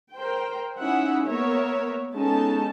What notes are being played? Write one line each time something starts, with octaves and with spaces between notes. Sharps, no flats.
A#4 C5 G5
C#4 D#4 E4 E5 F#5
A#3 B3 A#4 C#5 E5
G#3 B3 C#4 D#4 A4 A5